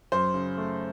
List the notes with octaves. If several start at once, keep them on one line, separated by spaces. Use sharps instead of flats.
F#2 C5
C#3
A3